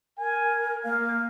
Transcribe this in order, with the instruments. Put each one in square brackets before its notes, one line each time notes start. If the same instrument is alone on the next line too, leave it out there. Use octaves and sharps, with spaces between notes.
[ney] A#4 [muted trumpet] G#5
[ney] A#3 [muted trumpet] F5